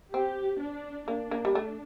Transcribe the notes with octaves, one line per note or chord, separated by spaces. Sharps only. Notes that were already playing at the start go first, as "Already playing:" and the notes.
C4 G4
D4
A#3 D4
A#3
G3
A3